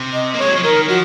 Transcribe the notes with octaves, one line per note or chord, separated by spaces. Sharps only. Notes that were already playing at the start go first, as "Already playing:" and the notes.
Already playing: C3
D#5
A#3
G#3 C#5
F#3
F3
D#3 A#4
F3 F#4